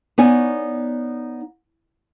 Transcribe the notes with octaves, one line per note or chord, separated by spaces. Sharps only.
B3 D#4 C#5 D5 G#5